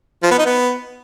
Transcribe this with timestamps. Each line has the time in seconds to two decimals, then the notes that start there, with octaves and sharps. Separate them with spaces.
0.23 F3
0.31 B3
0.39 D#4
0.46 B3